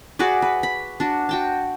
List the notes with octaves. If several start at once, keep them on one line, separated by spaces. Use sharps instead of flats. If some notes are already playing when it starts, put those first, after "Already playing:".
F#4 G#4 B4 D5
B4
B5
D4 F#4
F#4 G5 A5